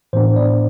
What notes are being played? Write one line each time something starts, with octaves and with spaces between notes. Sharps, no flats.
A2 E3 B3 D4 C5
D5